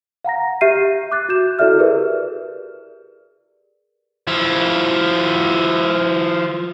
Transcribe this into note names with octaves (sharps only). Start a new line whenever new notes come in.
F5 F#5 A#5 A#6
G4 E5 F6 G6 C7 D#7
D6 F#6 A6
F#4 G6 E7
E4 F#4 A4 D5 E5 F6
G4 G#4 A#4 B4 D5
F3 E4